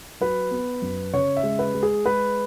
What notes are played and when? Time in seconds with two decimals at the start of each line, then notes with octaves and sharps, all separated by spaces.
0.21 F#3 B4
0.51 B3
0.82 F#2
1.14 C#3 C#5
1.37 E5
1.43 G#3
1.59 B4
1.74 G#3
1.83 G#4
2.05 G#3 B4